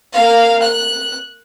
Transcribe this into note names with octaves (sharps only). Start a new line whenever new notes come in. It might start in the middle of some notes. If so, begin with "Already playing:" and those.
A#3 F5
F#6